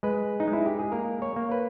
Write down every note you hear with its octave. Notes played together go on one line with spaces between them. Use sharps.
G#3 B4
D#4
G#3
E4
G4
G#4
A#3 A#4
C#5
A#3
B4